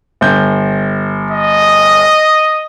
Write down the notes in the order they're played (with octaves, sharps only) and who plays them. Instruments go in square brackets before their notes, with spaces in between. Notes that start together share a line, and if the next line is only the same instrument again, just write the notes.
[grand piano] G1 G6
[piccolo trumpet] D#5